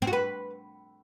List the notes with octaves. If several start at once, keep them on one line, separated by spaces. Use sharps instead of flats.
C4
F#4
B4